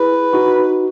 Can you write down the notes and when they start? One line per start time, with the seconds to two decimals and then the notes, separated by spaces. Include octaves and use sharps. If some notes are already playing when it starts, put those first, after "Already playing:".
Already playing: E4 G#4 B4
0.33 D#4 F#4